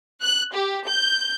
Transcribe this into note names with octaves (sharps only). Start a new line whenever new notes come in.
F#6
G4
G6